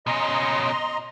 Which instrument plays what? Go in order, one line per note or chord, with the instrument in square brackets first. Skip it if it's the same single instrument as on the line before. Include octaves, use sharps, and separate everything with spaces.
[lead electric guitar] B2 C#4 [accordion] D#5 A#5 C6